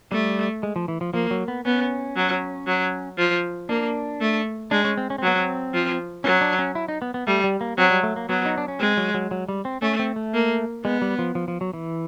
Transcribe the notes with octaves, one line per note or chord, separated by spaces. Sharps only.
G3 A3
G#3
F3
E3
F3
F3 A#3
F#3
B3
B3 C#4
F#3
F#3
F3
A#3 D4
A3
G#3 D4
C#4
C4
C#4
C4
F#3 B3
C4
F3
F#3 C#4
D4
C#4
E4
D#4
B3
B3
G3 A3
G3
A#3
F#3 C4
G3
A3
A#3
F#3 B3
D#4
D4
C#4
G#3 C4
F#3
F#3
F#3
G3
C4
A3 C#4
C4
A3
A#3
G#3 B3
G3
F3
F3
F3
F#3
E3